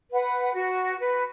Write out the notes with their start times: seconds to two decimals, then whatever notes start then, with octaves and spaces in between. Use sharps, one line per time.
0.12 B4 F#5
0.54 F#4
0.99 B4